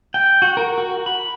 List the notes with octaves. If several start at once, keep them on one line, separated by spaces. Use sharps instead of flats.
G5
F#4
A#4
F#4
B5